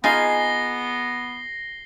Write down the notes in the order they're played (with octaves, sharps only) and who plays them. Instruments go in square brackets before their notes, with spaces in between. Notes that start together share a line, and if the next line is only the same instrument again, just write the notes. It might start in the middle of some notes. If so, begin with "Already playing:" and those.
[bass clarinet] B3 [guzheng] D#4 F4 [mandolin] G#4 [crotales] A#6 C7 G7